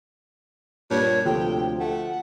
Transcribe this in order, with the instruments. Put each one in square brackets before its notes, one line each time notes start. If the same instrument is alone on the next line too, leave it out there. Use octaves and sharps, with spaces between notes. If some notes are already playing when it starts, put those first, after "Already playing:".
[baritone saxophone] G2 [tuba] A#2 [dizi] C#5
[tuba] D2 [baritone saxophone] C3 [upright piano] F3 A4 [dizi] G5
[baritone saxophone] A3 [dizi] F#5